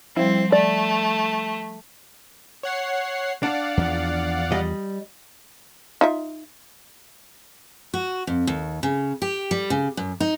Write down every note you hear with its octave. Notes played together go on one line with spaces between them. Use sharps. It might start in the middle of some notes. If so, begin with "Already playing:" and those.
F3 G3 C4 E4
A3 D5
C#5 F#5 C7
D4 D5 F5 F#5
E2 F3
G3 D#5
D#4 F4 E5
F#4
F2
D#2
C#3
G4
G3
C#3
F#2
D#4